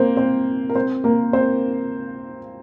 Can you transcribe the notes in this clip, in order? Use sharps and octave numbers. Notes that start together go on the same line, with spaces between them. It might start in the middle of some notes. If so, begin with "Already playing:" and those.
Already playing: A#3 C4 A#4 C5
C4 C5
A#4
C4 C5
A#3 A#4
C4 C5